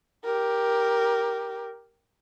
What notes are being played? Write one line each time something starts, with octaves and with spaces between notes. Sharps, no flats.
G4 A#4